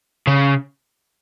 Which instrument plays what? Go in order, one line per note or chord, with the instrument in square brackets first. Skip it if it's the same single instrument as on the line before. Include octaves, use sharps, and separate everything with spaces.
[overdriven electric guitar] C#3